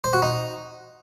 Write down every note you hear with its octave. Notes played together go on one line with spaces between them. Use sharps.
C5
F#4
D#4